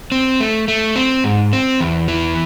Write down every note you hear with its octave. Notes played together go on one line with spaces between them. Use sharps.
C4
A3
A3
C4
G#2
C4
E2
E3